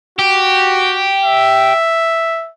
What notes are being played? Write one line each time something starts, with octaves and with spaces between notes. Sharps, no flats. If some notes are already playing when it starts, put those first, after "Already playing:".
F#4 G4
E5